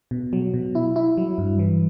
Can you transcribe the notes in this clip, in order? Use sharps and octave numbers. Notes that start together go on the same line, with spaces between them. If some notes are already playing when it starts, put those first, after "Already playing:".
B2
F#3
B2
E4
E4
F#3
G2
E3